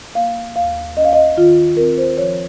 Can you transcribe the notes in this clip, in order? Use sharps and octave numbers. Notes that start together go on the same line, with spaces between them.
A#3 F5
D#2 F5
C#4 D#5
F5
D#5
D#3 F4
C4 A#4
C5
F3 C#5